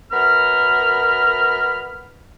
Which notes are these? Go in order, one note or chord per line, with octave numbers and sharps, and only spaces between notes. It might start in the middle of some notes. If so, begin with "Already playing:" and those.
F#2 B3 A#4 B5 F6